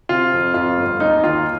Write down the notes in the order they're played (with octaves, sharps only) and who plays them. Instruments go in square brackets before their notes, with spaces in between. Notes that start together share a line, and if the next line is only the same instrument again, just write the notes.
[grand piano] C3 F4
F2
F2 F4
G1
D#2 D#4
D#3 F4